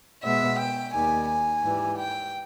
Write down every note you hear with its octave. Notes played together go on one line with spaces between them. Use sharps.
B2 G#3 B3 E5
G5
D#2 D#3 G3 G#5
G#5
G#2 E3 G3
G5